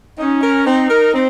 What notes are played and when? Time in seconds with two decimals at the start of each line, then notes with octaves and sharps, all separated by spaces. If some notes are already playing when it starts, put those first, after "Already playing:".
0.19 C#4 D#4
0.43 A#4
0.66 C4 D#4
0.90 A#4
1.14 C4